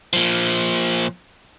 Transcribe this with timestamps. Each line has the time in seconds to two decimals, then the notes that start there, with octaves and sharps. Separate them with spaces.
0.13 A#2 F3